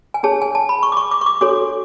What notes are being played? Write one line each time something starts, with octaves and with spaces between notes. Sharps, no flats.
G#5
D4 G#4 C#5 A5
G#5
A5
B5
C#6
D6
C#6
D6
C#6
D6
D4 F#4 A4 C#5 D6